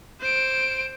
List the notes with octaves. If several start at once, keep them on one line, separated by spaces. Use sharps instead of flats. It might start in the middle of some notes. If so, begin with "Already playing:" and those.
C5 D7